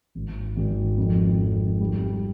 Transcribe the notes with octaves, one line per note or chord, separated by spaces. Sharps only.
G#1
G#1
F2
F2
G3